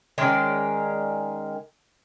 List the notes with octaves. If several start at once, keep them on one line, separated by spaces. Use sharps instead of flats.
D#3 G#3 C#4 D5